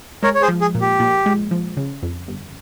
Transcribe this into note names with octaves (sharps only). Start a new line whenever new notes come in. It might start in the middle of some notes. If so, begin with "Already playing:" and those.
G#3 A#4 C#5
C#5
G#4 C5
F3
G#4
A#2
G4
A#2
G#3
F3
C#3
F2
G1